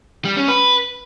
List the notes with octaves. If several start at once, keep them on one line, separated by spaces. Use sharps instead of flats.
G3
C#4
B4